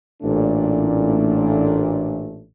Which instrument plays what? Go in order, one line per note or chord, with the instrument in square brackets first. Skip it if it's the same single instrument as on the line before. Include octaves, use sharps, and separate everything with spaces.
[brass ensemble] A1 A#2 A3 D4